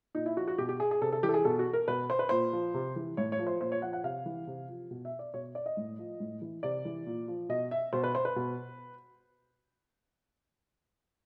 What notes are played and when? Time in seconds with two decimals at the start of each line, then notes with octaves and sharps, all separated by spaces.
0.15 A#2 D#4
0.26 E4
0.37 F3 F#4
0.47 F#4
0.58 B2 G4
0.69 G4
0.80 G#4
0.91 G#4
1.02 C3 A4
1.12 A4
1.23 E3 G4
1.29 A4
1.34 G#4
1.45 B2 A4
1.59 F#4
1.73 A#4
1.88 B2 B4
2.10 C5
2.19 B4
2.29 A#2 C5
2.53 F3
2.74 C3
2.96 E3
3.17 A2 C#5
3.32 C#5
3.39 F3
3.47 C5
3.61 A#2 C5
3.72 C#5
3.82 F3 F#5
3.93 F#5
4.04 C3 F5
4.26 E3
4.47 C3
4.69 F3
4.91 B2
5.05 E5
5.19 D5
5.34 B2 C#5
5.55 D5
5.66 D#5
5.77 A2
5.99 F3
6.20 A2
6.42 E3
6.63 C3 D5
6.85 E3
7.06 A#2
7.28 F3
7.49 B2 D#5
7.71 E5
7.93 B2 C5
8.04 B4
8.15 C5
8.25 B4
8.36 B2